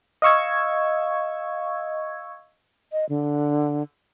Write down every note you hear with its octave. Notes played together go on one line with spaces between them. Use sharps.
D#5 F5 C#6 E6 G#6
D#5
D3